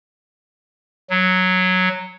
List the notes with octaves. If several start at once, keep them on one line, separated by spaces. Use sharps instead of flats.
F#3